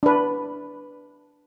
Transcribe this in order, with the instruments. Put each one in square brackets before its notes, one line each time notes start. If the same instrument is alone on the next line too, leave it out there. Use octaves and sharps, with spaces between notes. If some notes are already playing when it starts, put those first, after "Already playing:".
[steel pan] D4 B4